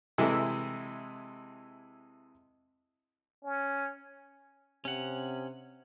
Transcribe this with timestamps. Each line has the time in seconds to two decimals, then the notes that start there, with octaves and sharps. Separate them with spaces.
0.18 C3 E3 G#3 E4 A4
3.44 C#4
4.85 C3 C#4 F#5